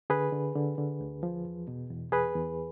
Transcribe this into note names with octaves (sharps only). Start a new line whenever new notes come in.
D3 G#4 B4
D3
D3
D3
D2
F3
E2
B2
E2
E2 G#4 B4
E2